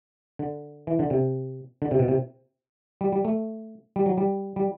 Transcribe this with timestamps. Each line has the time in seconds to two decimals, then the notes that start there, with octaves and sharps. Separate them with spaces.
0.39 D3
0.87 E3
0.99 D3
1.10 C3
1.82 D3
1.91 C3
1.99 B2
2.08 C3
3.01 G3
3.12 G3
3.25 A3
3.96 G3
4.06 F#3
4.17 G3
4.56 G3